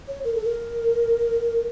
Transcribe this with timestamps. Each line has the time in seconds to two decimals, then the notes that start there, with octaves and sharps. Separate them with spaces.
0.08 C#5
0.24 A#4
0.34 A4
0.45 A#4